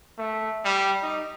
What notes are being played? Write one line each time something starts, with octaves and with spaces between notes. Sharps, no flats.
A3
G3
D#4